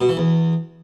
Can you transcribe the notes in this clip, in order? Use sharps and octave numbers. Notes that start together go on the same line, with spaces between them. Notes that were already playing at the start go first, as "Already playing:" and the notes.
B2
E3
E2